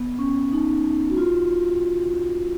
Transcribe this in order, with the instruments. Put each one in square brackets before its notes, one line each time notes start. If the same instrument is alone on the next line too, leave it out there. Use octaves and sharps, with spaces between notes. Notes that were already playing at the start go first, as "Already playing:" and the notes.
Already playing: [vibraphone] B3
C#4
D#4
F#4
F4